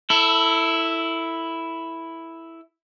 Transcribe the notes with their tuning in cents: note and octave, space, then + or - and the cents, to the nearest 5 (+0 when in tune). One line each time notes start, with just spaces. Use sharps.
E4 +0 A4 +20